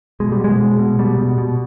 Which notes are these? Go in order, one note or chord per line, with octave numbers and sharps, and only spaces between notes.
B2 G#3
G3
B2 G#3
B2
B2
B2 G3
B2
B2